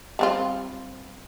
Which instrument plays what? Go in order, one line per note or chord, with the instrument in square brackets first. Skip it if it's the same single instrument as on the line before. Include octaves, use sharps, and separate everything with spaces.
[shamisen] G3 C4 F4